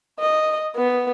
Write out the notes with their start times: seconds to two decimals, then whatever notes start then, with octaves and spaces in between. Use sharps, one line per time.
0.20 D#5
0.76 B3